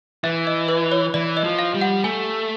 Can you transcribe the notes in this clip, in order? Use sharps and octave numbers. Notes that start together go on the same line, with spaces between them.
E3 E5
D#5
B4
C#5
E3 D5
D#5
F3
F5
G3
F#5
A3 G#5